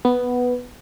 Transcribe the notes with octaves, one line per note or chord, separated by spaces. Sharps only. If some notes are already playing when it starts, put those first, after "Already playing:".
B3